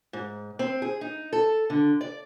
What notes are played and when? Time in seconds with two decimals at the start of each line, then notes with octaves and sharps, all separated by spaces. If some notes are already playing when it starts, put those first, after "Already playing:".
0.13 G#2
0.59 C4
0.82 G#4
1.01 D#4
1.33 A4
1.70 D3
2.01 D5